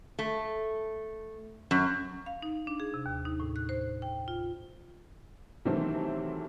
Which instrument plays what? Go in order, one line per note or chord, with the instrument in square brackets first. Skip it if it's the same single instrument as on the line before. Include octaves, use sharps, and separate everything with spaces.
[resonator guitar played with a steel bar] A3
F#2
[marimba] F5
D#4
D4
G#4
C3
D#2
D#4
A2
F#6
C5
G5
F4
[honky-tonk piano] C3 D#3 E3 F#3 A3 C4